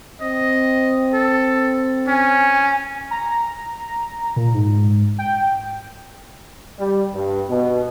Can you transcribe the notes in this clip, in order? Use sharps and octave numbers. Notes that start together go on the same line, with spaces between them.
C4 D#5
A4
C#4 G#5
A#5
A#2
G#2
G5
G3
G2
B2